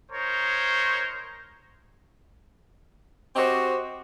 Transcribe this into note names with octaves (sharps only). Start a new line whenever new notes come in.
D#4 A#4 C5 C#5
C4 F#4 G4 C5 D#5